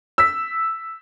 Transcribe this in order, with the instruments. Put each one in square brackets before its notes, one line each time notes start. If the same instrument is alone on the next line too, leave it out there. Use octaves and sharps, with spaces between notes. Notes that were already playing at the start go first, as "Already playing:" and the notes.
[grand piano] E6 B6